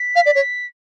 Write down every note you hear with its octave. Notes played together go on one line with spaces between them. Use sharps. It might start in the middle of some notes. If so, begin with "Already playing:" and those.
Already playing: B6
F5
D5
C#5